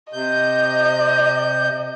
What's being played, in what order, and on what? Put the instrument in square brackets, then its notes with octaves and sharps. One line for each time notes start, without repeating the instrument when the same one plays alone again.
[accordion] C3 G6 [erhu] D#5